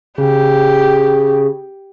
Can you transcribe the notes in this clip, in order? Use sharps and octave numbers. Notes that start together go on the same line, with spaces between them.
C#3 G4